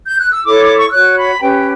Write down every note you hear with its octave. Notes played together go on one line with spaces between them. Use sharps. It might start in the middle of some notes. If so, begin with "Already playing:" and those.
G6
F#6
E6
E4 A4 C#5 D6
D6
C#6
E6
F#4 C#5 F#6
B5
C#4 G4 B4 G5